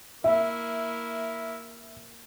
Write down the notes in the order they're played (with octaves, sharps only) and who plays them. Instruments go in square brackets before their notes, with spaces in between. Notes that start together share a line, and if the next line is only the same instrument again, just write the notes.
[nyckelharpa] A#3 E4 [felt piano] E5